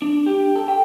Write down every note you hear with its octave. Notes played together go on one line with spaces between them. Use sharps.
D4
G4
A4
G5